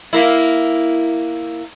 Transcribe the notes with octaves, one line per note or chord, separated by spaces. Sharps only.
A#3 E4